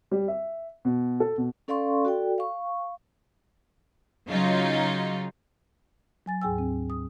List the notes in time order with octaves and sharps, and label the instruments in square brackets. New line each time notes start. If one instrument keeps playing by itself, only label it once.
[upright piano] G3
E5
B2
A4
B2
[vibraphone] C#4 A4 D5 F5 C6 C#6
F#4 A4 D5 G5
F5 C#6
[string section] C#3 F#3 D#4 F4
[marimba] F#3 G#5 A6
D2 G#2 G#4 G5 G#5 E6
C4
D#6